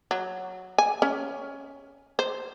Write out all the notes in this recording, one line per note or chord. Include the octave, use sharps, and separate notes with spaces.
F#3
G#5
C#4
C5